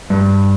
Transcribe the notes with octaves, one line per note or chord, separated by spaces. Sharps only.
G2